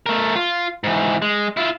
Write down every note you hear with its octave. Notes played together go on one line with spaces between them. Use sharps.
A3 A#4
F4
G#2 E3
G#3
E4 F4